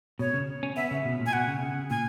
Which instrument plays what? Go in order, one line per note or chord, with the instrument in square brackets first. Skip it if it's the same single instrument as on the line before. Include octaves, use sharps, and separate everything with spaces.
[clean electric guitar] B2 [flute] C#5
[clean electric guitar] C#3
C#4
[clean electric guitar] B3 [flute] E5
[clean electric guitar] C#3
B2
A#2
[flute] G#5
[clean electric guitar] B2 [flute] F#5
[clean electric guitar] C#3
C#3
[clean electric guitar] A#2 [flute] G#5